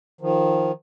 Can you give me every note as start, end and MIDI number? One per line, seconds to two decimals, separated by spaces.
0.21 0.72 51
0.21 0.72 53